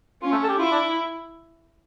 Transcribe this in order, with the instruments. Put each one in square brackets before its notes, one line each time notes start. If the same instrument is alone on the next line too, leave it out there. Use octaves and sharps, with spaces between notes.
[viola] C#4 [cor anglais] F4
[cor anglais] A3
A4
G4
[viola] E4 [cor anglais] F4
[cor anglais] D4